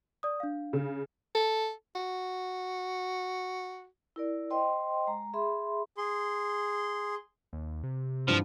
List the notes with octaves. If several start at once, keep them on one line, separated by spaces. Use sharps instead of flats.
D5 D#6
D4 F5
C#3
A4
F#4
E4 A#4 D5
C5 D#5 G5 C6
G#3 A#5
G#4 E5 B5 C6
G#4 C6
D#2
C3
C2 G2 F3 D4